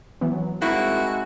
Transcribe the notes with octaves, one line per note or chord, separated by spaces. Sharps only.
E3 F#3 B3
G2 G#3 A#3 C4 D#4 E4 F#4